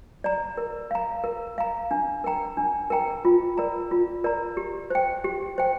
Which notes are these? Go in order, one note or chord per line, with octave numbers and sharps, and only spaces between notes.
D5 A#5
A#4
F5 A#5
A#4
F5 A#5
D4
A#4 G5 A#5
D4
A#4 G5 A#5
F4
A#4 D5 A#5
F4
A#4 D5 A#5
G4
C5 G5
G4
C5 G5